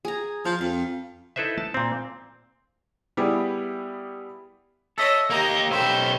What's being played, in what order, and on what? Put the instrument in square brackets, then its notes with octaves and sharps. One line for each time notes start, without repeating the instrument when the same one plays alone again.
[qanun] G#4 A#5
[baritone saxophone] F3 [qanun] F5
[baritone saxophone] F2 [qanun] F5
[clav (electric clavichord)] D#4 E4 A4 B4 C5 E5
A5
A#2 C4
[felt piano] G3 B3 E4 G4 G#4
[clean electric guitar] A4 E5 [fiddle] C#5 D#5
[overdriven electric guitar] A#3 G4 [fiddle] A#4 D#5
[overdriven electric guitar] B1 C5 [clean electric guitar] E4 [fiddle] G4 E5